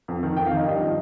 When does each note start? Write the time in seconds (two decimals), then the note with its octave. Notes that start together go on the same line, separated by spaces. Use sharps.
0.08 F2
0.23 D#3
0.37 F2 G5
0.46 F5
0.52 D#3
0.57 D#5
0.66 G2
0.81 F3